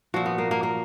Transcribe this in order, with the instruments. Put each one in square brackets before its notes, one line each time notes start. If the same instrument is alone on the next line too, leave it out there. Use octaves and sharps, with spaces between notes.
[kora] A#2 F3 F#4
B3
A#3
A#3
A#3